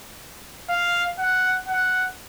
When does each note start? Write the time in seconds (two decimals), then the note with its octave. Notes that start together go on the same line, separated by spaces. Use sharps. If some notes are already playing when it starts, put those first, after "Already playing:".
0.69 F5
1.19 F#5
1.68 F#5